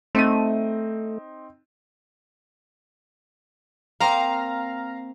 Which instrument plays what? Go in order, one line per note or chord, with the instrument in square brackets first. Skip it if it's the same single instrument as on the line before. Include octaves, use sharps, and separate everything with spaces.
[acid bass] A3 [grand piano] C4 D#4 D#7
[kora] A#3 C4 [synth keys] F5 A#5